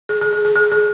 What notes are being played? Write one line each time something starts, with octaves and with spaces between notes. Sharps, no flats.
G#4
G#4
G#4
G#4
G#4
G#4